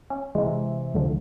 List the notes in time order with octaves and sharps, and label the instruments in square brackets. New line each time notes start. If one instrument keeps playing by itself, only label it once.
[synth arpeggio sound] C#4
[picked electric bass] C3 E3 [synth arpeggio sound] G#3 E4
[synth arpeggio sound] C#2 D3 F3